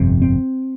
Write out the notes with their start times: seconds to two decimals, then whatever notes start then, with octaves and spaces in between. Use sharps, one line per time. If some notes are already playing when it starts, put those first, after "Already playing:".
Already playing: G1 F2 C3
0.22 C4